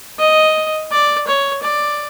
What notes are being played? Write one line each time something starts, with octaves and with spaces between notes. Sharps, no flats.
D#5
D5
C#5
D5